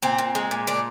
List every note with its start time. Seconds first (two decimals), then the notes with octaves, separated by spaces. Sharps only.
0.02 A#2 C4
0.18 A#2
0.35 G#3
0.51 A#2
0.67 A#2 D4